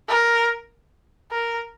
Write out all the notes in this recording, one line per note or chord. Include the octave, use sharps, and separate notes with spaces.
A#4
A#4